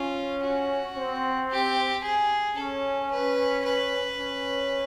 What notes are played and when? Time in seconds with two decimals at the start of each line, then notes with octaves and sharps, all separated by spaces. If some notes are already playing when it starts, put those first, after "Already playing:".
Already playing: C#4 F4
0.43 F#4
0.96 C4
1.50 G4
2.04 G#4
2.57 C#4 A4
3.11 B4
3.65 B4
4.19 C#4